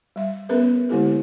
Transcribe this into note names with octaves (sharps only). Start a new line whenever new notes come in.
G3 E5
B3 C#4 G#4 A#4 B4 E5
C#5
D3 G#3 A#3 E4 G4 A4